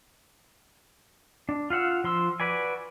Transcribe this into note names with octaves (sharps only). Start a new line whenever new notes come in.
D4
F4 F5 F#5 E6
F3 C6 E6
F#4 B4 D5 G#5